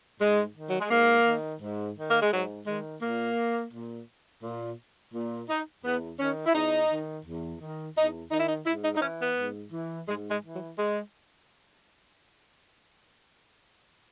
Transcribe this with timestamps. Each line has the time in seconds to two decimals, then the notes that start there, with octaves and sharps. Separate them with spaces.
0.20 G#2 G#3
0.55 D#3
0.69 F#3
0.79 G#3
0.90 G#2 A#3
1.25 D#3
1.61 G#2
1.97 D#3
2.10 A#3
2.21 G#3
2.32 G#2 F#3
2.67 D#3 G#3
3.01 A#2 A#3
3.73 A#2
4.43 A#2
5.14 A#2
5.49 D#4
5.84 E2 B3
6.19 D#3 C#4
6.46 E4
6.54 E2 D#4
6.90 D#3
7.25 E2
7.61 D#3
7.96 E2 D#4
8.31 D#3 D#4
8.39 E4
8.47 D#4
8.66 G#2 E4
8.84 D#4
8.96 D#4
9.01 E3 C#4
9.20 B3
9.36 G#2
9.72 E3
10.07 G#2 G#3
10.30 G#3
10.42 E3
10.54 F#3
10.78 G#3